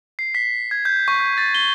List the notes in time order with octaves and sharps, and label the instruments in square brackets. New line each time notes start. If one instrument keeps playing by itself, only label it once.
[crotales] C7
B6
G#6
G6
C#6
G6
A6
G7